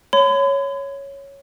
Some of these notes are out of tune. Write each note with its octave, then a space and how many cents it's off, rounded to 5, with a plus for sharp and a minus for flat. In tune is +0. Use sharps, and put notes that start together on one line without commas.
C#5 +0 B5 +45